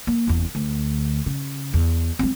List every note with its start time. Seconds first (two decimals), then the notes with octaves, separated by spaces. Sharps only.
0.07 A#3
0.27 F#1 E2
0.55 D2
1.26 C#3
1.74 E2
2.19 G3 C4